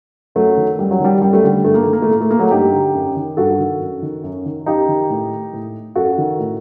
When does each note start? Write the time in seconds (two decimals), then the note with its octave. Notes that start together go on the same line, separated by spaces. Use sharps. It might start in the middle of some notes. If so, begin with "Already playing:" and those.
0.35 F#2 F#3 A3
0.57 D#3
0.79 F#2 G3
0.91 F#3
0.99 D#3 G3
1.22 F#2 G3
1.33 A3
1.43 D3 G3
1.65 G2 A3
1.74 A#3
1.84 D#3 A3
1.93 A#3
2.02 A3
2.08 A2 A#3
2.21 A3
2.31 A#3
2.39 F#3 A3
2.51 G2 D#4 G4
2.73 D3
2.94 F#2
3.16 D#3
3.37 G2 F#4 A4
3.59 D#3
3.80 F#2
4.02 D#3
4.24 F#2
4.45 D#3
4.66 F#2 D#4 G4
4.88 D#3
5.10 A2
5.53 A2
5.95 F#2 F#4 A4
6.18 D#3
6.39 A2